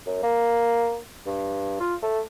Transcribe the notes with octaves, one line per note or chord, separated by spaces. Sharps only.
F#2
A#3
G2
F4
A3